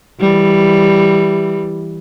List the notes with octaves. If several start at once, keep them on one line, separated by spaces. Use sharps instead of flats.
E3 G3